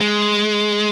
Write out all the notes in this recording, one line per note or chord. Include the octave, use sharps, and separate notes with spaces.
G#3